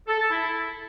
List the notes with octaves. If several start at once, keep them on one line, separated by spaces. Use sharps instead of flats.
A4
A5
E4